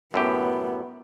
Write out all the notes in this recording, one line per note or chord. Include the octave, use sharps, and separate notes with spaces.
F#2 A2 B3 G4